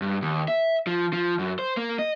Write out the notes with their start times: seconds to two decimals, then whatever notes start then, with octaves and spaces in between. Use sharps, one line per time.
0.02 G2
0.22 D#2
0.48 E5
0.87 F3
1.13 F3
1.39 F#2
1.59 C5
1.77 A#3
1.99 D#5